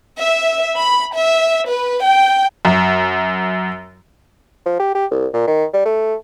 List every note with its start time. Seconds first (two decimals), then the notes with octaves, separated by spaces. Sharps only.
0.19 E5
0.75 B5
1.16 E5
1.69 B4
2.04 G5
2.65 F#2
4.66 F3
4.79 G4
4.94 G4
5.11 C2
5.34 A#2
5.47 D#3
5.74 G3
5.85 A3